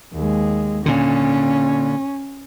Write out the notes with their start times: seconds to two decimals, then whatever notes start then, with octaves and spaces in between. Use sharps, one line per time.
0.13 D#2 G#3
0.86 A#2 D3 C#4